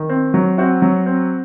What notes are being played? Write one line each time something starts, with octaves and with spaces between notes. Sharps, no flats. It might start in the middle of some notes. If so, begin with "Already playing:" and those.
Already playing: D#3
C4
F#3
C4 F#4
F#3
C4